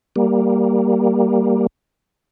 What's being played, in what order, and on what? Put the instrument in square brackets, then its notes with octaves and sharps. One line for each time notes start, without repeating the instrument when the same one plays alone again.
[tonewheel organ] G3 A#3